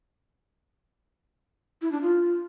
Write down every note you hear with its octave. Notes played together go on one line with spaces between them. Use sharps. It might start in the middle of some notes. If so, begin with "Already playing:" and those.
E4
D4
F4